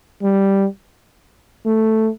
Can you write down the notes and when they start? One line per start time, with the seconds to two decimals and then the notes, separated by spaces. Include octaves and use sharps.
0.22 G3
1.66 A3